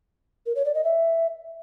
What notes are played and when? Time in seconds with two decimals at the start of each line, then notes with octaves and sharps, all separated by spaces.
0.46 A#4
0.56 C#5
0.65 D5
0.75 D#5
0.84 E5